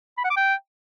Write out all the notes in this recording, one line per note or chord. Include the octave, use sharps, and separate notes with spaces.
B5
F#5
D6
G5